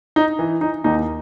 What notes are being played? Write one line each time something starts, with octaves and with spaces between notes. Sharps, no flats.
D#4
E3
D#4
D#2 D#4